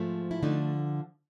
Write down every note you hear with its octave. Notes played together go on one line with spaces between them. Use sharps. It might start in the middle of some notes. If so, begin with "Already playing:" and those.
Already playing: G#2 F3 A3
E4
D3 F3 A3 D#4